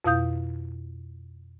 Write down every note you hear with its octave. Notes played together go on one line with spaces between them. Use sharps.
F2 B2 E4 F5 D#6 G6